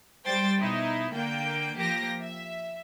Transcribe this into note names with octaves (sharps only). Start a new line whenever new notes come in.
G3 C5 G5 A6
B2 D#4 E4
D3 A#3 G5
F3 A#3 G4 A#6
E5